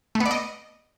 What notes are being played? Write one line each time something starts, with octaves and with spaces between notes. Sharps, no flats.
A3
B3
D5
D#5